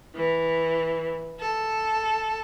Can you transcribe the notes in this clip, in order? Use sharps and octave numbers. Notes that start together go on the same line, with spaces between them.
E3
A4